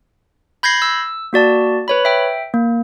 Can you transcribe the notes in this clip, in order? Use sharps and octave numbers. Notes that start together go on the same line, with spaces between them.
B5 G6 G#6 A#6 C7
E6
A#3 F#4 D5 A5
B4 C#5 B5
E5 G5
A#3